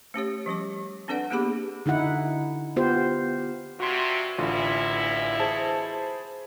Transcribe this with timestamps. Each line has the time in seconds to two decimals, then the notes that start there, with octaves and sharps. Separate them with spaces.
0.14 A3 C#4 G4 C#5
0.46 F3 G3 C#4 D6
1.08 C4 D4 A4 B4 D5 F#5
1.30 A#3 B3 G4 G#4 B5 D6
1.86 D3 D#4 E4 F#5
2.76 B3 F4 G4 C5
3.80 G2 C3 F#4 C6
4.38 A1 B2 D3 G#3 E4 F4
5.40 G#4 C5 A5